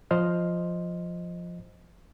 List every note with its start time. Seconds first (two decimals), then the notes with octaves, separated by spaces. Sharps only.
0.11 F3 C5 D#5 F6